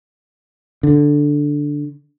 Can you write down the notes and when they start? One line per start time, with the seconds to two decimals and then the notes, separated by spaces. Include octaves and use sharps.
0.83 D3